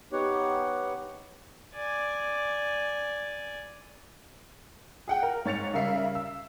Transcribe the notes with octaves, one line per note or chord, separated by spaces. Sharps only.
B3 D#4 G4 C#5 F#5
D5 G#5
G#4 F#5 G5
A#4
G#2 C#5 A6 C#7 F7
C#3 G3 A#4 E5 C7
E6